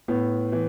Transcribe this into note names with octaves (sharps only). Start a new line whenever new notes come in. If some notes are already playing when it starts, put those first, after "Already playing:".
A2 B3
E3